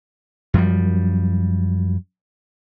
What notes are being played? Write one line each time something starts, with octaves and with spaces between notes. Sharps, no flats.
F#2 F3 G3